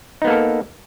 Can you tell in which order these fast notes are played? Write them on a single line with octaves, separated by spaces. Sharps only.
D#4 B3 A#3 A4 A#4